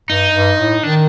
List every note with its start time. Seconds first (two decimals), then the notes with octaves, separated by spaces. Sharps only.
0.09 G2 D#4
0.34 G2
0.59 A2
0.83 D#3 D4